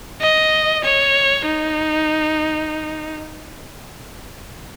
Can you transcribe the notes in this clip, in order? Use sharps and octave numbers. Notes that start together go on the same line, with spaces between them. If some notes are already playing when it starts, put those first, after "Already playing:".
D#5
C#5
D#4